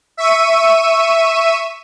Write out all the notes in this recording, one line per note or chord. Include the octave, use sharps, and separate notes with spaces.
E5 C#6 D#7